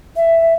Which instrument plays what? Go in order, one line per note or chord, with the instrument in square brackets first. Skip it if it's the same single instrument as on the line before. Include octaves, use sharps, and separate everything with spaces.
[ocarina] E5